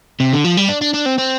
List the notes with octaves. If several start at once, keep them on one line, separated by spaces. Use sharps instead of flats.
C3
D3
F3
G3
D4
D4
D4
C4
C4